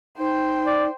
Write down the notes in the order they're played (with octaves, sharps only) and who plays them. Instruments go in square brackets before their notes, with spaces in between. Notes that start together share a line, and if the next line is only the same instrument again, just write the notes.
[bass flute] D#4 [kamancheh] C5 G5
[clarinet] D5